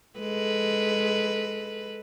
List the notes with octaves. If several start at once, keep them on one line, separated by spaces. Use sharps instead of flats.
G#3 A4 B4